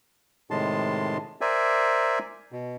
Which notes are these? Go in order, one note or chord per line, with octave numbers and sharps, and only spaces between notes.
A2 C3 D#3 G#3 A5 C6
A#4 C5 D5 E5 G#5
B2